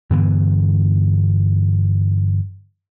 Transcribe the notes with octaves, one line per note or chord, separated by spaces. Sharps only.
G2 D3 E3 B3